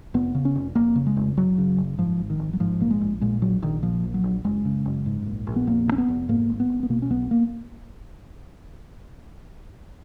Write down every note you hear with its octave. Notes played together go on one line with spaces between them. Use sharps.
F1 B3
C#3
C#4
F1
F1 A#3
C#3
G#3
F1
F#1 F#3
C#3
F#1
G#2 F3
G#1
D#3
G#1
F#3
G#2 F3
A#1 A#3
G#3
A#1
A#2 G#3
A#1 F#3
A#1 D#3
A#2 F3
A#1
F#3
A#1
F#1 G#3
C#3
F#1
G#2
A#1
A#1
B3
F1 A#3
C#3
C#4
B3
F1
G#2 A#3
G#1
B3
G#1
B3
B2 A#3
C#4
B1 B3
A#3